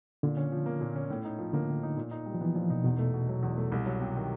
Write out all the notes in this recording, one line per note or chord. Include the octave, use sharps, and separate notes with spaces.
A#2 D3
C#4
F3
A#3
A#2
C#4
A2
D#4
F3
D3 A#3
A2
D#4
A#2
D#4
G3
F3
E3 B3
A#2 F3
B2 D#4
E2 B2
A3
B2
F#3
E2
A3
C2
F#3
C3
D#3